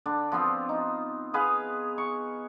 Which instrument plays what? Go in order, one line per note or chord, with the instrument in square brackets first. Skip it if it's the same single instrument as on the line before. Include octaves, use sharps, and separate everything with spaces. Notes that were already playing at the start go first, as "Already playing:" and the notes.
[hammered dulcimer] D3 D4
F3 B3 C4 F4
D#4
B3 G#4 B4 F5
C#6